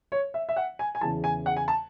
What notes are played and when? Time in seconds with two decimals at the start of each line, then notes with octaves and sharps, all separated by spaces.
0.12 C#5
0.34 E5
0.49 E5
0.57 F#5
0.79 G#5
0.95 G#5
1.01 E2 C#3 E3 A5
1.24 G#5
1.46 F#5
1.56 G#5
1.68 A5